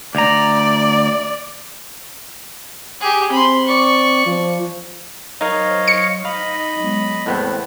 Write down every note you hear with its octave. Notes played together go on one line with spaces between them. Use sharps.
D2 D5 A#5
G4 G#4
C4 B5 C6
D5 C#6
F3
F#3 D#4 A#4 C5 C#5 D#5 F5
C#7
D#4 D#5 F5 B5
F#3 G#3 B3
E2 A2 E3 F#3 G#3 B3 C4